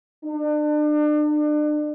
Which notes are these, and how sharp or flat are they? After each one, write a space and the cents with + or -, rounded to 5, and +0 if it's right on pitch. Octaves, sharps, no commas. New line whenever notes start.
D4 +35